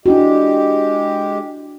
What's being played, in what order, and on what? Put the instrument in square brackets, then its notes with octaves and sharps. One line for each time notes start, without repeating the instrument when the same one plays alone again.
[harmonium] G#3 G4 [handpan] D4 E4 F#4